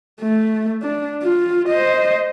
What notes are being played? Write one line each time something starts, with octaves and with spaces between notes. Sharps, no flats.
A3
D4
F4
C5 D#5